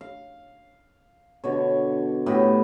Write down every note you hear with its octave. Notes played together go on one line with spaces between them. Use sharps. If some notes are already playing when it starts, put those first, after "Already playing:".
F5
B2 D3 C#5
A2 B3 G4 D#5